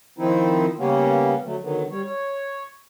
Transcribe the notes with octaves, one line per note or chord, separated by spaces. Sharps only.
D#3 F3 C4 D#4 E4
C#3 G3 A#3 B3 C#4
D3 F#3 A3
D3 D#3 F#3 B3
G3 C#5
C#5